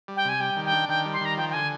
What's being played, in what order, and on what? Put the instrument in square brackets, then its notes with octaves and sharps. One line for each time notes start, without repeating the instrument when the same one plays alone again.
[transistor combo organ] G3
[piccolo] G5
[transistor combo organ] C3 [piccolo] G#5
[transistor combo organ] G3 [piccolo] G5
[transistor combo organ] D#3
[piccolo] G5
[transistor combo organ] D4
[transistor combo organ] D#3 [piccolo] G5
[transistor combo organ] G3
[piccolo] C6
[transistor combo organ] D#3 [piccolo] A#5
[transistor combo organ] F3 [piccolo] G5
[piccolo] G5
[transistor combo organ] D3 [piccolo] G#5